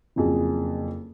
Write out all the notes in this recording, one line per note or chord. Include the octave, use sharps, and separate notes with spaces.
F#1 F2 G#4